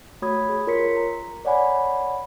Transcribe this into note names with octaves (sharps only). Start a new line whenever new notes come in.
A3 F#4 C#5 B5 D#6 G#6
G#4
F4 A#4 C#5 C6 B6 C#7
A#5
C#5 D5 F#5 G#5 B5